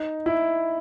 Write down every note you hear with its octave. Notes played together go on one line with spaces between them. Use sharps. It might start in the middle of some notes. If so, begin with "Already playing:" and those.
Already playing: D#4
E4